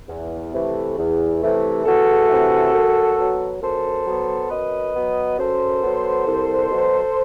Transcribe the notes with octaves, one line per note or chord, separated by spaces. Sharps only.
E2
C3 E3 A3
E2
C3 E3 A3
E2 F#4 A4
C3 E3 A3
F#2
F#3 B3
F#2 A4 C5
F#3 B3
F#2 B4 D#5
F#3 B3
F#2 A4 C5
F#3 B3
C2
B2 F#3